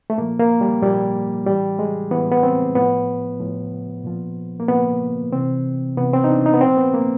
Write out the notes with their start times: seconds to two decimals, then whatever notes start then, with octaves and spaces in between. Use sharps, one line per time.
0.10 A3
0.18 A#2 F3 A#3
0.39 A#3
0.61 G3
0.82 A#2 F3 G3
1.46 A2 E3 G3
1.79 G#3
2.11 A2 E3 B3
2.32 B3
2.43 C4
2.75 A2 F3 B3
3.40 A2 F3
4.04 A#2 F3
4.60 A#3
4.68 A#2 F3 B3
5.32 C3 E3 C4
5.97 C3 E3 B3
6.13 C4
6.24 D#4
6.29 D4
6.46 D#4
6.54 B3
6.61 A#2 F3 C4
6.77 B3
6.94 A#3